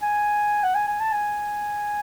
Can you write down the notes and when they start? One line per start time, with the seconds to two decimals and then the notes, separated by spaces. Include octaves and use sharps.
0.02 G#5
0.64 F#5
0.75 G#5
0.88 G#5
1.00 A5
1.12 G#5